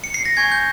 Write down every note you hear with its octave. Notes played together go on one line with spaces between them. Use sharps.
C#7
C7
A#6
G#5 C#6 G6 G#6
G6